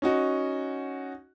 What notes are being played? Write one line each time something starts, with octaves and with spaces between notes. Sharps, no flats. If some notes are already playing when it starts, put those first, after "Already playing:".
C#4 D#4 F#4